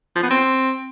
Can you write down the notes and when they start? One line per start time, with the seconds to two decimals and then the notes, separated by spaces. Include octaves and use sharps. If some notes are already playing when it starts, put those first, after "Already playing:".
0.15 F3
0.23 B3
0.30 C4